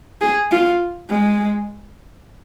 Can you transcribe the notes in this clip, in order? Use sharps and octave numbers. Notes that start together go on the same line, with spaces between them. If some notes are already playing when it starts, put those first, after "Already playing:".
G#4
F4
G#3